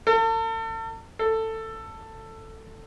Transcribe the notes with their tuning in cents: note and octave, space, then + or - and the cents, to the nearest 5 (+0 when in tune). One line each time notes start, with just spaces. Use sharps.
A4 +40
A4 +15